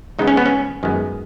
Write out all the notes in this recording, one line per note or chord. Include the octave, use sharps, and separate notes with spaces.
C#2 C#3 G#3 B3 D#4
C#4
B3
C#4
F#2 D#3 G#3 B3